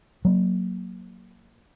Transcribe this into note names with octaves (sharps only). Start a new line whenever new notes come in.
F#3 A#3